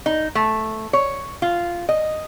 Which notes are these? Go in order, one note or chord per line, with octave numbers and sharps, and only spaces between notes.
D#4
A3
C#5
F4
D#5